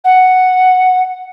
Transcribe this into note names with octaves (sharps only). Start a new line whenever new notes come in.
F#5